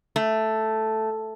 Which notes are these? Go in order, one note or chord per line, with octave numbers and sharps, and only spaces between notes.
A3